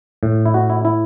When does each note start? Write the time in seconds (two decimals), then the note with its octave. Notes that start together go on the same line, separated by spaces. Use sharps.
0.23 A2
0.46 E4
0.54 F#4
0.70 E4
0.85 E4